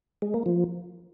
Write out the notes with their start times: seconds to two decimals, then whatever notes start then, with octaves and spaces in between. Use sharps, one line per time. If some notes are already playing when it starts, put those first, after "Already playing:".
0.22 G#3
0.34 A#3
0.46 F3